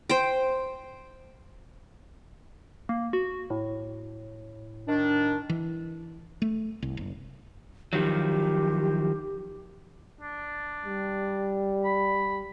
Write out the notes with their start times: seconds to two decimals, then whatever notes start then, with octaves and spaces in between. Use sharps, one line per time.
0.09 C5 G5
2.89 A#3
3.13 F#4
3.50 A2
4.88 D#3 D4
5.49 E3
6.42 A3
6.82 C2
6.97 F#1
7.93 D#3 F3 F#3 G4
10.21 D4
10.85 G3
11.84 B5